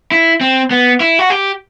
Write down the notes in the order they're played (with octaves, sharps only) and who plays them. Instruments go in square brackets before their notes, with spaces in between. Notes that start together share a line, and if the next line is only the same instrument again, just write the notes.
[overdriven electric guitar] E4
C4
B3
E4
F#4
G4